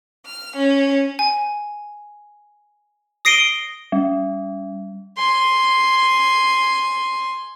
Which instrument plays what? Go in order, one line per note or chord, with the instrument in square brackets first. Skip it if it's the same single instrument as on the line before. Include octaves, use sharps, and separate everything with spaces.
[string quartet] F6
C#4
[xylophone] G#5
D#6 A#6 C7 D7 D#7 G7
[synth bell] G3
[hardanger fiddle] G#5 C6